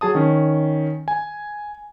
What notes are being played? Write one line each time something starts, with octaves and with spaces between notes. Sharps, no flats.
F#3 G#4 A5 D#6
D#3 C#4
G#5